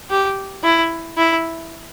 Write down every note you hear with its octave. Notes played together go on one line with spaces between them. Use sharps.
G4
E4
E4